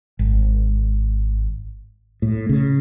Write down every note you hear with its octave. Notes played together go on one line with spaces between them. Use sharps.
G#1
A2
C#3